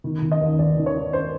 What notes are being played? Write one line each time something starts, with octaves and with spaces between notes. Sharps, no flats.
D#3
D#3
D#5
D#2
D#2 D5
D#3
C#5
D#3
C5